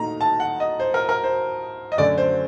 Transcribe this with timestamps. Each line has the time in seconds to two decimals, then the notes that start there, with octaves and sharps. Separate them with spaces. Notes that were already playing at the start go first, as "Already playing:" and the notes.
Already playing: A#2 A3 D#4 A#5
0.21 A5
0.40 F#5
0.60 D#5
0.80 C5
0.94 A#4
1.09 A#4
1.24 C5
1.92 D#5
1.98 F#2 D3 A3 D5
2.18 C5